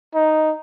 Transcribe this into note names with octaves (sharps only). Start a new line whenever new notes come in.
D#4